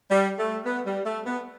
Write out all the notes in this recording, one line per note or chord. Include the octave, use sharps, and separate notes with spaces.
G3
A3
B3
G3
A3
B3